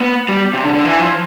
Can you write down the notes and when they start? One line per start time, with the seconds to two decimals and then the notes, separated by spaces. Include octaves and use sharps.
0.01 B3
0.29 G3
0.53 C3
0.63 D3
0.74 D3
0.85 E3
0.99 F3